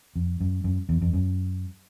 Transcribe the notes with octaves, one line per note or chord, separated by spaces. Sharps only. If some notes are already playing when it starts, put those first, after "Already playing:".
F2
F#2
F#2
E2
F2
F#2